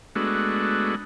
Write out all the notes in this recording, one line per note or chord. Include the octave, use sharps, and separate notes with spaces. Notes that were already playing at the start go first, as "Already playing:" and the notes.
G#3 A3 B3 D4 F#4